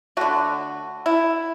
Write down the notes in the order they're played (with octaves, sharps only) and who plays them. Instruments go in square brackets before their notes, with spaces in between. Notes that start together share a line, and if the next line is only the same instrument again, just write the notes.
[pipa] D3 A3 F#4
E4